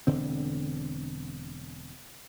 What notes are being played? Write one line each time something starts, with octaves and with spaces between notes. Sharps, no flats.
E1 D3 C4